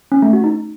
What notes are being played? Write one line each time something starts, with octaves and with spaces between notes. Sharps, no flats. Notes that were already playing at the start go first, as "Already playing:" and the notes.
C#4
A3
F#4
D#4